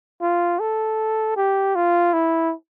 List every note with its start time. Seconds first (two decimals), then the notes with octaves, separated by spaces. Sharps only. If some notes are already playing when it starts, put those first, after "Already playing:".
0.21 F4
0.60 A4
1.36 G4
1.75 F4
2.14 E4